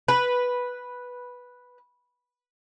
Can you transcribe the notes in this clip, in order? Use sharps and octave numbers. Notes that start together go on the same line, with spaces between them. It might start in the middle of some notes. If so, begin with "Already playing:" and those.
B4